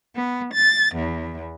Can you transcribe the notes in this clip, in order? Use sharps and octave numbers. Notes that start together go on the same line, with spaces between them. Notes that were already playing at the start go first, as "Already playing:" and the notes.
B3
A6
E2